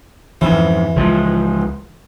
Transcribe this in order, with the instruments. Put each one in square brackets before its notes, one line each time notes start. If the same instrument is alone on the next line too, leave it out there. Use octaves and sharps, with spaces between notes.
[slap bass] F2 G#2 [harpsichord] E3
[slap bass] C#2 F3 G#3